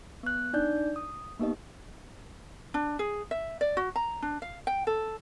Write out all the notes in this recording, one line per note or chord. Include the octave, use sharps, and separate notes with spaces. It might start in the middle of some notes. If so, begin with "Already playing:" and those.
B3 F#6
D4 D#4 D5 G6
D#6
A#3 B3 D#4 G4 D#5
D4
G#4
E5
D5
F#4
A#5
D4
F5
G5
A4